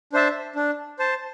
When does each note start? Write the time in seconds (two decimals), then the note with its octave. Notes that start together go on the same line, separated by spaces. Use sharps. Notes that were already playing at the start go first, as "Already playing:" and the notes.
0.13 D4 C5 E5 A5
0.56 D4
0.99 C5 A5